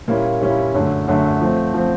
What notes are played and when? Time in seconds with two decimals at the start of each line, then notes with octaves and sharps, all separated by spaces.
0.08 A#2 G3 A#3 C#4 E4
0.41 A#2 G3 A#3 C#4 E4
0.74 F#2 D3 F#3 A3
1.07 F#2 D3 F#3 A3
1.41 F3 A3 C4
1.74 F3 A3 C4